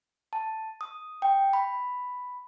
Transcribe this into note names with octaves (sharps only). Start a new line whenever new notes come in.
A5
D#6
G5
B5